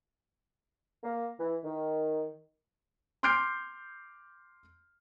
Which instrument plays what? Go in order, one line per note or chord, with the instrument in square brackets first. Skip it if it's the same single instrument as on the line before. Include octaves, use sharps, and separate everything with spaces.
[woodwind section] A#3
E3
D#3
[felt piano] C6 D6 F6 G6 C7 D7